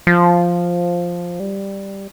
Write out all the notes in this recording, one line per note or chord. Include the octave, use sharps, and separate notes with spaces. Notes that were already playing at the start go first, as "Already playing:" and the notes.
F3
G3